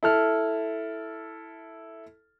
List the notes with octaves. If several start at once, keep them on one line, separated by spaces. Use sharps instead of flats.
E4 A4 F6